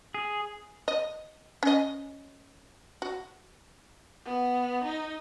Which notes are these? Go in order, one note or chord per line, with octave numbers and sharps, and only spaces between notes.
G#4
D#5
C#4 D#5
F#4
B3
D#4